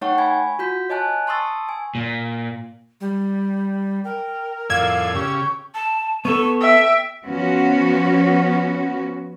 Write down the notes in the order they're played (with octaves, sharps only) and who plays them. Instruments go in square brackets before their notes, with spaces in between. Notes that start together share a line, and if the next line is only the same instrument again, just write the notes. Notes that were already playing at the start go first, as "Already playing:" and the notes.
[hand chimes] A3 D#4 C#5 F#5 G5 C#6
G#5 B5 G#6
F4 F#4 G6 B6
C#5 D#5 G#5 A5 F#6
A5 C6 C#6 D#6 E6 A6
G#5
[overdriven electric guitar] A#2
[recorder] G3
[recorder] A#4 [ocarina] G5
[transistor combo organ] F2 A2 D5 [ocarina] F5 [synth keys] E6 G#6
[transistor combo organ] C#3 G4 [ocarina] C#6
[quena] A5
[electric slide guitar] B3 A4 [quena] C#6
[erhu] E5 [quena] G5
[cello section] F3 B3 C#4 F#4